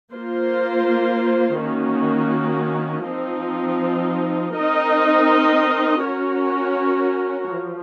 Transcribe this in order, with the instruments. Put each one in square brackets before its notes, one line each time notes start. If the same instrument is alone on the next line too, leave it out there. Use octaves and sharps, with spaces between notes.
[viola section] A#3 F4 C5
D#3 A#3 C#4 F#4
F3 C4 D#4
C4 D#4 A#4 D#5
C#4 F#4 A#4 C#5
F3